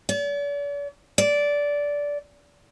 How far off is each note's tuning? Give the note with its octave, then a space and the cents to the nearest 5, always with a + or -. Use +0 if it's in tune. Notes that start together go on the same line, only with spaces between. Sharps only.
D5 -45
D5 -15